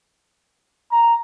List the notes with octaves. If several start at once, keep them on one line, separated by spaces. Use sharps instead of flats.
A#5